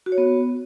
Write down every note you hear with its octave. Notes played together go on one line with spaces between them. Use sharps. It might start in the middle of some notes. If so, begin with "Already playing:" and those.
F#4
C#5
B3